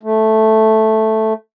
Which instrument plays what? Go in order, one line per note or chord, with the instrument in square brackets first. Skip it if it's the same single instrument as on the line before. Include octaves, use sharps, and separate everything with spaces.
[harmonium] A3